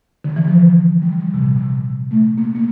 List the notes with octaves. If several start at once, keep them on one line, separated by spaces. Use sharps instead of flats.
D3
E3
F3
G3
G3
C3
A#2
C3
A3
A#3
A#3